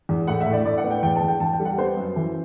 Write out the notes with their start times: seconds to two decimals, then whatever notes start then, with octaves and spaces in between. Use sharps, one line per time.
0.09 E2
0.27 A2 F#5
0.41 E5
0.47 A2
0.53 D5
0.65 A2 D5
0.78 F#5
0.84 B3
0.91 G5
1.03 E2 G5
1.16 A5
1.22 E2
1.28 G5
1.40 E2 A5
1.53 G5
1.60 G3
1.65 F#5
1.78 B3 C5
1.97 F#2
2.16 E3